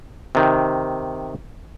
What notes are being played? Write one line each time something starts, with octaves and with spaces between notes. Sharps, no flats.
C3 D#3